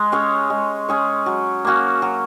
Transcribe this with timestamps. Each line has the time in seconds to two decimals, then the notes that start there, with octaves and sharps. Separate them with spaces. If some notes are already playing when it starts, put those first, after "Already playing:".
Already playing: G#3
0.12 C#4 G#4 C#5
0.50 G#3
0.89 C#4 G#4 C#5
1.26 F#3
1.65 A#3 C#4 F#4
2.02 F#3